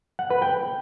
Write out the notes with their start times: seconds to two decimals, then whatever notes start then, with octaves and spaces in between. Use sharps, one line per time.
0.19 F#5
0.30 B4
0.42 G5